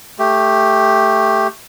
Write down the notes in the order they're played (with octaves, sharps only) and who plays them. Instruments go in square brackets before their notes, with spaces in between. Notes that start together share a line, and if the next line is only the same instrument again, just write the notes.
[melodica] A3 G4